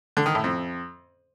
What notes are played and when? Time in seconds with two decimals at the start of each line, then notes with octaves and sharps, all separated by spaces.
0.17 D3
0.26 D#3
0.35 A2
0.44 F2